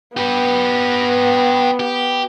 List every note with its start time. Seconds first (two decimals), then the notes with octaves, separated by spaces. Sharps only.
0.17 B3 G4 B4
1.80 G4